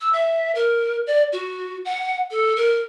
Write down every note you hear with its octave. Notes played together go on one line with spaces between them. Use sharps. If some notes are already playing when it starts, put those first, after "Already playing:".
E6
E5
A#4
D5
F#4
F#5
A4
A#4